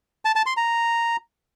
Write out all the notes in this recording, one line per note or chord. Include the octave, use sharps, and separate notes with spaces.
A5
A5
C6
A#5